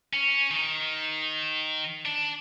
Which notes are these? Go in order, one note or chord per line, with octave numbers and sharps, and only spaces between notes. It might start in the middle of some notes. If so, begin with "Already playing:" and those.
C#4
D#3
D4